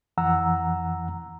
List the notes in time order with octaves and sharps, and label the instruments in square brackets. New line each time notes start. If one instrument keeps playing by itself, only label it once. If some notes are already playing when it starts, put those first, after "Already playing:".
[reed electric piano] F2 E3 F#5 A#5 E6